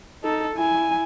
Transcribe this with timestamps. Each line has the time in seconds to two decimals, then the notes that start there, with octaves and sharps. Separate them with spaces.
0.24 D#4 A4
0.56 E4 G#5